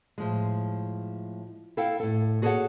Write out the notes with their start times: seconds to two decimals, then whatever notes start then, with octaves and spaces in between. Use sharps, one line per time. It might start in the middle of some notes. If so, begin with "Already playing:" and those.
0.18 A2 F3 G#3
1.77 E4 A4 F5 G5
2.00 A2 A4
2.42 F#4 G#4 A4 C5 C#5 F#5